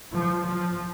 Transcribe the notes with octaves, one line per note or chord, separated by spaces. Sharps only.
F3
F3